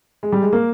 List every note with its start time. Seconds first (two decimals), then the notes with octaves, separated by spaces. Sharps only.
0.23 G#3
0.32 G3
0.42 G#3
0.53 A#3